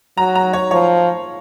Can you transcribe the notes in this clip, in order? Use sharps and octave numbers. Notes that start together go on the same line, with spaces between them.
F#3 A#5
A#5
C#5
F3 C#5